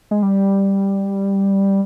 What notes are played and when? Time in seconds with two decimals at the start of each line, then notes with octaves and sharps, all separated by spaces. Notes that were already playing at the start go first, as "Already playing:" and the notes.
0.11 G#3
0.22 G3